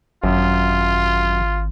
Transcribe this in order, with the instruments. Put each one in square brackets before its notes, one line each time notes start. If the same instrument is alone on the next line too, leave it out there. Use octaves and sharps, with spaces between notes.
[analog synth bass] G#1 [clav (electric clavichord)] F#2 [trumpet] F4